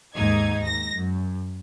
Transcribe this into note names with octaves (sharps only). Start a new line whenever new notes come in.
D#2 G#2 D#4 G#6
D#2 A#6
F#2